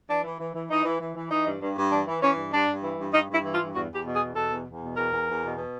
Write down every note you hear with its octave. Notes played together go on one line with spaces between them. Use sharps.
E3 D4
E3
E3
E3
E3 D#4
E3
E3
E3
E3 D#4
G2
G2
G2
E3 D4
E3
E3 C#4
G2
G2 D4
G2
E3
G2
G2 D#4
G2 E4
E3
F4
G2
E2 F#4
E2 G4
B2
G#4
E2
B2 A4
E2
E2
B2
E2 A#4
E2
E2
B2
B2